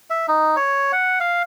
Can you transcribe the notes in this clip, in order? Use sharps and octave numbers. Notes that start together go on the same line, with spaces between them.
E5
D#4
C#5
F#5
F5